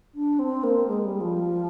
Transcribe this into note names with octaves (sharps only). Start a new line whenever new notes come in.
D4
C4
A#3
G#3
G3
F3